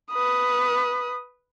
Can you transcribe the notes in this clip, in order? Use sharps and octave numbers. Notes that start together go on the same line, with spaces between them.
B4 D#6